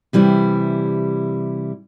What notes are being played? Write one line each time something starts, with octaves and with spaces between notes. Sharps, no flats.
C3 E3 G3 E4